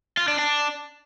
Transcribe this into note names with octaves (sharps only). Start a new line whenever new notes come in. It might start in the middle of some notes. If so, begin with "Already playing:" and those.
F4
D4
D4